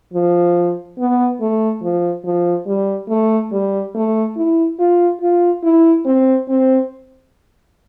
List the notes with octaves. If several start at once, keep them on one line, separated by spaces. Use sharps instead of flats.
F3
B3
A3
F3
F3
G3
A3
G3
A3
E4
F4
F4
E4
C4
C4